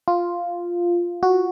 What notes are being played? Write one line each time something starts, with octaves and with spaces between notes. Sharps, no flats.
F4
F#4